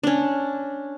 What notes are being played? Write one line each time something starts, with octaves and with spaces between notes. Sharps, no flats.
C#4 D4